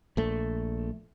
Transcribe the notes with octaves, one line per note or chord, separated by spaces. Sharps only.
A#1 A3